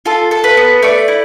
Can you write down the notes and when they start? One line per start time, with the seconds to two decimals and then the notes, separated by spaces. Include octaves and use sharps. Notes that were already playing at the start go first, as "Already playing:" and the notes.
0.06 F4 A4
0.31 A4
0.44 B4
0.57 B3
0.82 A3 D5
1.08 E4